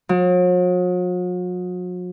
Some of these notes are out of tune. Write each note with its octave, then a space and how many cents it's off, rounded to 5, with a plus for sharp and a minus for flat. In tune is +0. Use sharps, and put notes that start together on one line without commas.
F#3 -45